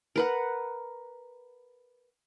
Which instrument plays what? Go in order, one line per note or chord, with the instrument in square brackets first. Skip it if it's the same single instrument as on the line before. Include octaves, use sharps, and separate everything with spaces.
[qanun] A#4 B4 F#5